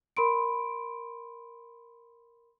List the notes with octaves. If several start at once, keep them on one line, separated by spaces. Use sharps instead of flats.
A#4 B5 C6 D7